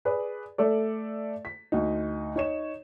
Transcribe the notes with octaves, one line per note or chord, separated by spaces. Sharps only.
G#4 B4 D5
A3 A4 D5
B6
D2 D#4
D#4 C#5 E7